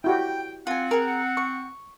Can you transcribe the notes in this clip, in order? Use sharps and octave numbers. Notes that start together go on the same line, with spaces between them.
E4 F#4 G4 G5
C4 F4 F#5 G#5
G#4 A#4
C#6